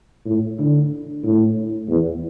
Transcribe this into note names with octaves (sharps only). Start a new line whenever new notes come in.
A2
D3
A2
E2